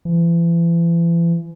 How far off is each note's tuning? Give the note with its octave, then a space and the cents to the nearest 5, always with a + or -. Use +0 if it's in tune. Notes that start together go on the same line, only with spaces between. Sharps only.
E3 +40